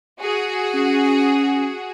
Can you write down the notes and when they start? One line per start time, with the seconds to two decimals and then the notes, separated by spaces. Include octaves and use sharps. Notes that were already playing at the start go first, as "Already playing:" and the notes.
0.20 F#4 G#4
0.75 C#4